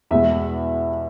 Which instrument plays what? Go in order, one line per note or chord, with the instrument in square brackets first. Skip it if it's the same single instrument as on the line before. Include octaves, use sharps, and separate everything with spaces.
[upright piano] E2 B2 G#3 E5